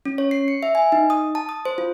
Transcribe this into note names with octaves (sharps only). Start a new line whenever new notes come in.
C#4
C#5
C7
C#7
E5
G#5
D#4
D#6
A5
D#6
C5
F4